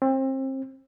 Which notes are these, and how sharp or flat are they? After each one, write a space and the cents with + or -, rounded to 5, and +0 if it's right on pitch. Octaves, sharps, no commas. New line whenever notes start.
C4 +30